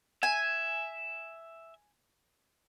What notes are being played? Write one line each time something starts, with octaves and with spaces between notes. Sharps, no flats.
E5 G#5